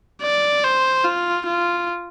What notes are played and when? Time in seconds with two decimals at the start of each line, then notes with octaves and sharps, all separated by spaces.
0.22 D5
0.64 C5
1.04 F4
1.46 F4